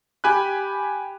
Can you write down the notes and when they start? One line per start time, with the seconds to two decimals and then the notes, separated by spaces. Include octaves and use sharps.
0.24 G4 G#5 B5 F#6